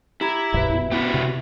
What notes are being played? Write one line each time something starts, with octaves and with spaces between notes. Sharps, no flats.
E4 G4 A#5 G#6
D#1 A#1 F#2 B4 E5
B2
B3 E4 F#4 G4
C3